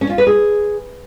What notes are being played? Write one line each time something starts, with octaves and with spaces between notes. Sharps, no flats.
C#4
F4
B4
G#4